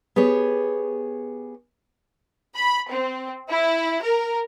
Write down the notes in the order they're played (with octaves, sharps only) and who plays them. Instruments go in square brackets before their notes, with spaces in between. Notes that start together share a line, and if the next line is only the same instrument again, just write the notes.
[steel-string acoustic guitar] B3 G4 G#4 C#5
[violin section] B5
C4
E4
A#4